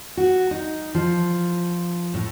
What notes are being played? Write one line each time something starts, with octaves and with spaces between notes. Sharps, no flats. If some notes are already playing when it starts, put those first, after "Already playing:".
F#4
D#4
F3
A2